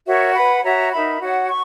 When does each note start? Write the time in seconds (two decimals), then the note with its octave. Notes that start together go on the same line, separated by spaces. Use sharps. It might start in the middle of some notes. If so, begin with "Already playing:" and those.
0.07 F#4 A#4 C#5 E5
0.35 B4 F#5 B5
0.63 F#4 C#5 E5 A#5
0.92 D#4 A#4 E5 B5
1.21 F#4 C#5 F#5
1.49 C#6